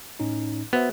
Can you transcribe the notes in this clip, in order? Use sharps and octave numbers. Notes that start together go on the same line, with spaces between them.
A2 C#4 D#4
B3 F#4 C5 E5